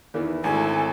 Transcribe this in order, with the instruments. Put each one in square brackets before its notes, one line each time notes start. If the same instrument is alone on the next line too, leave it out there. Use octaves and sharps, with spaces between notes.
[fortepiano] E2 D#3 E3
[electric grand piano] G#1 [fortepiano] D2 G#4 [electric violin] E4 A4 [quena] G#5